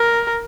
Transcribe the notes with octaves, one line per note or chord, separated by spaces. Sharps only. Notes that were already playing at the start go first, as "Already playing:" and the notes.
Already playing: A#4